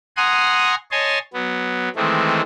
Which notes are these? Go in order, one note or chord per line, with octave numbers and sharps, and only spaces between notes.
F#5 G#5 A#5 C6 D#6
C#5 D#5 G#5 A5 C6
F#3 B3
D#3 E3 G#3 A3 C4